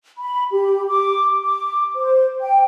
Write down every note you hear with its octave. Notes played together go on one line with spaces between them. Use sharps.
B5
G4
D6
D6
C5
G5